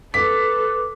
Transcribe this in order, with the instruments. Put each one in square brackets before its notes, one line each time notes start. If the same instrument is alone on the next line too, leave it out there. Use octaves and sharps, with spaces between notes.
[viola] A4 [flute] B4 [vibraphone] D6 [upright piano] B6